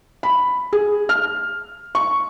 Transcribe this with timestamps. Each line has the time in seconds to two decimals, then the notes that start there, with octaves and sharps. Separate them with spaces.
0.23 B5
0.73 G#4
1.09 F6
1.95 C#6